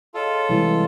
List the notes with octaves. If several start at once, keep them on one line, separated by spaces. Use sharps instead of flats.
F4 G#4 A4 C#5 D#5
C3 E3 G3 G#3